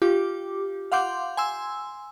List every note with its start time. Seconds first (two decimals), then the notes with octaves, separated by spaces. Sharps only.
0.02 F4 G4 D6
0.92 F5 F#5 C6 D6 G6
1.37 G#5 C6 E6